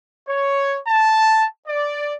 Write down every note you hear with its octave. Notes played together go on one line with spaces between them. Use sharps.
C#5
A5
D5